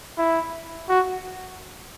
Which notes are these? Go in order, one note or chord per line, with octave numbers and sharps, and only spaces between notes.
E4
F#4